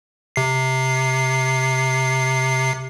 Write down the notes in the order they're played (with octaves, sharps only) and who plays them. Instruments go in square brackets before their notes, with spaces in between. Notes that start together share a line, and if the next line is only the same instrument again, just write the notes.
[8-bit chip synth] C3 C7